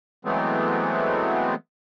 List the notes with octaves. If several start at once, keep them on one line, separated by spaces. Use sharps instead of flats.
E3 F#3 G#3 A3 B3 C4